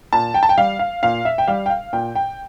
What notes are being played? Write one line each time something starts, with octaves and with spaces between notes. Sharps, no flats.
A#2 A5
G5
A5
G5
G3 F5
F5
A#2 F5
E5
G5
G3 F5
G5
F5
A#2 G5
G5